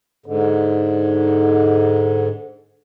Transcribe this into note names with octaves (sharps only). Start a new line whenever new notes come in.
G#2 D3